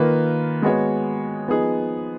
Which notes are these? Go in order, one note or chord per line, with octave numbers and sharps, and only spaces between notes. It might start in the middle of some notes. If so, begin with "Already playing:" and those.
Already playing: D#3 A#3 F4 B4
G#3 B3 F#4 C#5
F3 B3 D#4 G#4